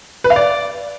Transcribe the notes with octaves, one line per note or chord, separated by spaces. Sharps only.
B4
F5
D5